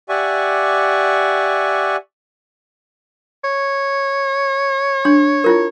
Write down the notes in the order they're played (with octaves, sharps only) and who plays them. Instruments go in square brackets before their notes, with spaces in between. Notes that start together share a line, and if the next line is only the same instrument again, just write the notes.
[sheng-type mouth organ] G4 D5 E5 F#5 G#5 C#6
[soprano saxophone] C#5
[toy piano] D4 C6
E4 F4 A#4